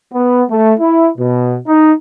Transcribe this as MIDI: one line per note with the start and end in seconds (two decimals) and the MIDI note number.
0.13 0.43 59
0.50 0.73 57
0.79 1.09 64
1.17 1.57 47
1.67 1.93 63